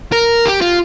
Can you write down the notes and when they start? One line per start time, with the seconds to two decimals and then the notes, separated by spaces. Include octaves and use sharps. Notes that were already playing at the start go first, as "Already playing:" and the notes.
0.12 A#4
0.46 G4
0.61 F4